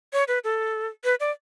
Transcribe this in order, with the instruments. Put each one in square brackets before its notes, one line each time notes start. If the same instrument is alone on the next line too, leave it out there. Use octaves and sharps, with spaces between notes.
[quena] C#5
B4
A4
B4
D5